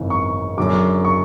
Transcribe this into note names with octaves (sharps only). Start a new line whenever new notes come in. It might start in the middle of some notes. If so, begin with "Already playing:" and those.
Already playing: G#1 F#2 C#3 E3
C#6
F#1 F#2 D3 F#3 D6
C#6